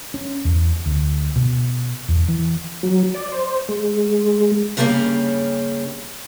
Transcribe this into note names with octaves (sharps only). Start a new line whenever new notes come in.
C#4
E2
D2
B2
E2
E3
F#3
D5
C5
G#3
G2 C#3 G3 A#3 B3 C#4